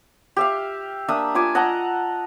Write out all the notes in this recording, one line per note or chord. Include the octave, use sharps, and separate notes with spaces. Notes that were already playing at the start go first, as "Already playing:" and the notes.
G4 E5 F5
A#3 D4 E5 D#6
F4 E5 G#5 D6
D#5 F#5 A5 A#5